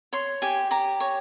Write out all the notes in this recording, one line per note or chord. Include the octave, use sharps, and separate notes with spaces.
C#5 C6
G4 G#5
G4 A#5
C#5